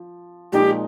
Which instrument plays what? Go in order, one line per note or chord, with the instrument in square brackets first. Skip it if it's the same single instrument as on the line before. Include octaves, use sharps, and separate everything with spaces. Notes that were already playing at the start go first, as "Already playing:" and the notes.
Already playing: [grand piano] F3
[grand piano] A#2 F3 G#3 D#4 [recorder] G4